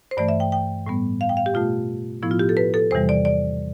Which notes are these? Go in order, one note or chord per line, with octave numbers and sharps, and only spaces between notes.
C5
G2 E3 A3 D5
E5
G5
G5
A2 G3 B3
F5
G5
F5
G4
B2 A3 F4
A2 F3 B3 E4
F4
G4
A4
B4
A4
E2 C3 E3 G3 C5
D5
D5